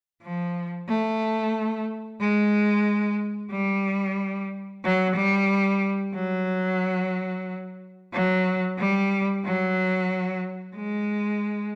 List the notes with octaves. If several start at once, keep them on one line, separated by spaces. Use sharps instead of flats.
F3
A3
G#3
G3
F#3
G3
F#3
F#3
G3
F#3
G#3